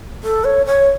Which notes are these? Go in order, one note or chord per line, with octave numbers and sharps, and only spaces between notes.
A4
C#5
C#5